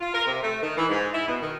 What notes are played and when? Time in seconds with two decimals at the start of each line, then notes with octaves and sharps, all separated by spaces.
0.01 F4
0.14 A#4
0.27 C3
0.43 A3
0.63 D#3
0.77 E3
0.89 G#2
1.13 E4
1.27 B2
1.41 D#3